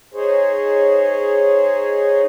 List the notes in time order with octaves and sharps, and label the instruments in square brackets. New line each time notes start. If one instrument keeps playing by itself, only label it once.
[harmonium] D#4 G#4 C5 C#5